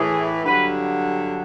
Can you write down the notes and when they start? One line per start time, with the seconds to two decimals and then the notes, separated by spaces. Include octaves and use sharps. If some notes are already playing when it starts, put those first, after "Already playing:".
Already playing: A2 E3 G#4
0.44 G2 D3 F#3 B4